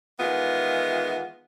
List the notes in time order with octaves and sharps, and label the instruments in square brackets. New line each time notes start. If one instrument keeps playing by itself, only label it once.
[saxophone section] D#3 E3 G#3 B3 F4